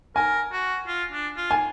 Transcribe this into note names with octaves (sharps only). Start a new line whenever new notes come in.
A#4 G#5
F#4
F4
D4
F4
G#5